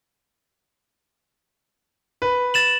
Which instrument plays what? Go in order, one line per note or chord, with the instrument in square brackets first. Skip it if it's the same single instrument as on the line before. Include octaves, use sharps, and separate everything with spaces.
[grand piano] B4
[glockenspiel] A6 E7 F#7